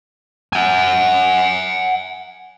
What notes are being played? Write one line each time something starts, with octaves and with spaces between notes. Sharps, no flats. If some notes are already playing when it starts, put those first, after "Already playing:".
F#5 G#5